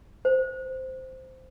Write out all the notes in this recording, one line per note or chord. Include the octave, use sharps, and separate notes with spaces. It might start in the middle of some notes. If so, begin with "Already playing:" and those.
C5